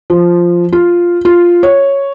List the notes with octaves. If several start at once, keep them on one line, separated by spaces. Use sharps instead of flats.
F3
F4
F4
C#5